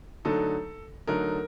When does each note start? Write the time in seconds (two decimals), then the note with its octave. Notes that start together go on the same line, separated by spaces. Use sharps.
0.25 D3 F#3 A3 D#4 A4
1.07 D3 F#3 A3 D#4 A#4